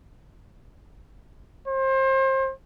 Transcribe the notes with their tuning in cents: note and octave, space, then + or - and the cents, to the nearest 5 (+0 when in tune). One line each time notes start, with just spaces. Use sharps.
C5 +30